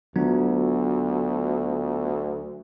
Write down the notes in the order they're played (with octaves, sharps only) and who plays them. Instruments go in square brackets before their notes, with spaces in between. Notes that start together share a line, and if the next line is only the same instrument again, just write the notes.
[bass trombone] D2 [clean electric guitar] F#3 [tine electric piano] B3 D4 F4